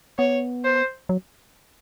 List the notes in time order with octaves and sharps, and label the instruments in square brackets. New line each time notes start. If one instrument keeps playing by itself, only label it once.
[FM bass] B3 [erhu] C#5
[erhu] C5
[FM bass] F#3